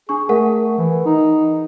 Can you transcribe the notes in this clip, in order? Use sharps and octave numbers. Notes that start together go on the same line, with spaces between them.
D4 G#4 C#6
A3 G#4 A#4 F#5
E3
D#4